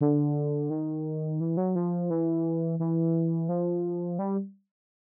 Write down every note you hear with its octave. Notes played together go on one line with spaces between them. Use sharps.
D3
D#3
E3
F#3
F3
E3
E3
F3
G3